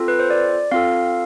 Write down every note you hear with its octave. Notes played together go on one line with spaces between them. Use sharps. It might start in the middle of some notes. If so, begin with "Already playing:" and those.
Already playing: C4 F4 A4
B4
C5
D5
C4 F4 A4 F5